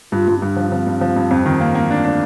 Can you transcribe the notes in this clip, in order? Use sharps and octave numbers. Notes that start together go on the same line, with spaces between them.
G2 F4
G2
C4
G2 D4
F3
F3 C4
G2
F3
G2
F2
D#3
A#3
A#3
G3
A3 D4
D4